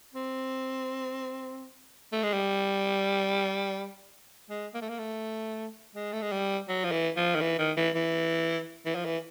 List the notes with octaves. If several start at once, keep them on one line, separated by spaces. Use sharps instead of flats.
C4
A3
G#3
G3
G#3
A#3
A3
A#3
A3
G#3
A3
G#3
G3
F#3
F3
E3
F3
D#3
E3
D#3
E3
E3
E3
F3
E3